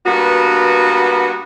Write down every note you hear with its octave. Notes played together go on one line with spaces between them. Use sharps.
G2 A#3 B3 F#4